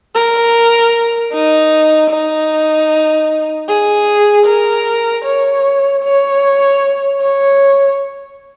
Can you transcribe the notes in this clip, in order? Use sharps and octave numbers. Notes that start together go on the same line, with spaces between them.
A#4
D#4
D#4
G#4
A#4
C#5
C#5
C#5